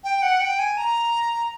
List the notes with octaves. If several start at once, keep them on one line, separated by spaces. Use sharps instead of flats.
G5
F#5
G5
G#5
A#5